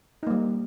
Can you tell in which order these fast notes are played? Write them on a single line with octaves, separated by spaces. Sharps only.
D#4 A#3 G3